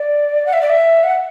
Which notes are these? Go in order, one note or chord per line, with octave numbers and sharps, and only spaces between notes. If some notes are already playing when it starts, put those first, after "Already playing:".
Already playing: D5
F#5
E5
D5
E5
F#5